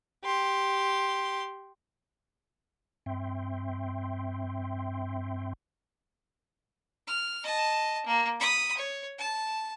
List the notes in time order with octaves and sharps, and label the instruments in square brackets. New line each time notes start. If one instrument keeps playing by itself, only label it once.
[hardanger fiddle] G4 C6
[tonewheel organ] G2 C4 E5 G5 C6
[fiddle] F6
D#5 A5
A#3
B5 D#6
C#5
A5